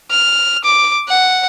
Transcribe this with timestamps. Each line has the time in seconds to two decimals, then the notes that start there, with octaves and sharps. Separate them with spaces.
0.11 F6
0.65 D6
1.08 F#5